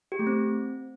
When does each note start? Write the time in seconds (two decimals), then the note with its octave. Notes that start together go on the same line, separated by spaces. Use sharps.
0.12 G4
0.19 A3
0.27 C4